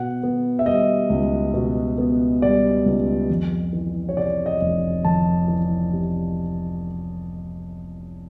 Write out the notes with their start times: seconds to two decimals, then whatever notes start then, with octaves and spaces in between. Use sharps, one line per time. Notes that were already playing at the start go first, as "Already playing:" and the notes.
Already playing: B2 F#5
0.23 B3
0.59 E5
0.66 G3 D#5
1.10 C#2
1.54 B2
1.98 B3
2.42 G3 D5
2.86 C#2
3.30 F2
3.73 E3
4.09 C#5
4.17 C3 D5
4.46 D#5
4.61 F1
5.04 F2 A5
5.48 E3
5.93 C3